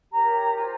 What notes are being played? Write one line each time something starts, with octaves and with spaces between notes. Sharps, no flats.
G4 A#4 C#5 A#5
F4 C5 G#5